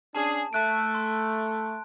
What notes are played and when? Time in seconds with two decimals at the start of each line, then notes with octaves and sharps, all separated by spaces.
0.15 C#4 D4 G#4 A5
0.53 A3 A5 F#6 D7
0.95 C6